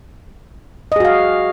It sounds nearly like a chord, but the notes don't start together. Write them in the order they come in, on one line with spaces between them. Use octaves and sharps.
D#5 G#4 F#4 F5